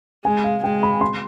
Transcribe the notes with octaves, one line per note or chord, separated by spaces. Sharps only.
G#3 G#5
F5
G#3 G5
B5
C6